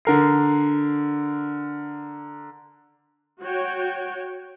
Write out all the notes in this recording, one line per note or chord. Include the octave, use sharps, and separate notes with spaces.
D3 A#4 C7
F#4 C#5 G5